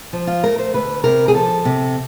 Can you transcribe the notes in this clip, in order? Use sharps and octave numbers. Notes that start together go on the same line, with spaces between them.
F3
F4
A3 A#4
C5
D2 B4
C3 A#4
G#4
F3 A4
C3